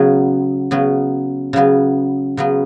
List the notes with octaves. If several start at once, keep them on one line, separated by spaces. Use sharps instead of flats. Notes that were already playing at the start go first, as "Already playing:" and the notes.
Already playing: C#3 F#3 B3
C#3 F#3 B3
C#3 F#3 B3
C#3 F#3 B3